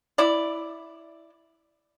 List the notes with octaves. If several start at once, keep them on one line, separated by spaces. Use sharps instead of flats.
E4 D5